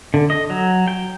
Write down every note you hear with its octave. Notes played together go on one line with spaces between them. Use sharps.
D3
D#5
F#3
G5